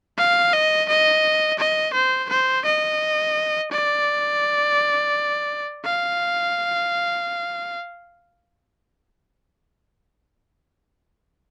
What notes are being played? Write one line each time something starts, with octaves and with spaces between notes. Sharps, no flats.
F5
D#5
D#5
D#5
C5
C5
D#5
D5
F5